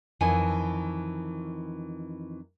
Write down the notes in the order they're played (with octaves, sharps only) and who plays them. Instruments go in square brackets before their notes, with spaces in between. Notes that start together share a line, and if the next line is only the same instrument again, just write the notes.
[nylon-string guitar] F2 D#3 E3 G#5